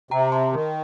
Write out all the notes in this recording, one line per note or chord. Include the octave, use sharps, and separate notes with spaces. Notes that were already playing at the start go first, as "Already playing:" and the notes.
C3 G5 A#5
A5 C6
D#3